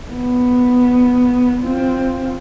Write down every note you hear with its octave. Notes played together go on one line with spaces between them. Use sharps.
B3
C4 F4